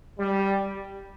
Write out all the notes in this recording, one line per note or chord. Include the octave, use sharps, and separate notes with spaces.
G3